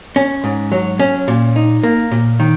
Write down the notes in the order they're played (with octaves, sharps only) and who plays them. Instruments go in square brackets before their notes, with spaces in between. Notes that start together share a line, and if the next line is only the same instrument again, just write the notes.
[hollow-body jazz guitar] C#4
G#2
F#3
C#4
A#2
D#4
A#3
A#2
D#3